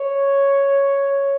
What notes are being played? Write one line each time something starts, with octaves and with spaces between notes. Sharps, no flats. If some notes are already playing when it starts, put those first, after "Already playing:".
Already playing: C#5